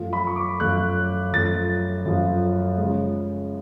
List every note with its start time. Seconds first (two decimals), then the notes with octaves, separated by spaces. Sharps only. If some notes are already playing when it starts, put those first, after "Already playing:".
Already playing: F#2 F3 A3 F4
0.13 B5
0.27 C#6
0.36 D6
0.60 F#2 F3 A3 F4 F#6
1.33 F#2 F3 A3 F4 A6
2.05 F#2 F3 A3 F4
2.78 C#3 F3 G#3